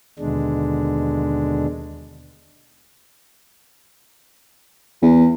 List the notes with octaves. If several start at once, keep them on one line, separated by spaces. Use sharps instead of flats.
D#2 B2 D3 G#3 D4
E2